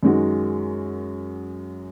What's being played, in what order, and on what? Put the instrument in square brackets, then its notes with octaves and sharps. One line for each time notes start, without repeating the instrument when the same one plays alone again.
[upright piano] F#2 D#3 G#3 D#4 F#4